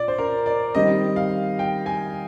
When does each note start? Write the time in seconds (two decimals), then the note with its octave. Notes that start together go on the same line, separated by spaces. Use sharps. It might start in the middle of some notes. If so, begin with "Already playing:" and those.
Already playing: A#2 D5
0.08 C5
0.18 A#4
0.46 D5
0.75 D#3 G3 C4 D#5
1.16 F5
1.59 G5
1.86 G#5